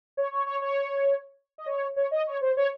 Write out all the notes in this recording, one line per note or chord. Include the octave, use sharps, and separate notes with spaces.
C#5
C#5
C#5
C#5
D#5
C#5
C#5
D#5
C#5
C5
C#5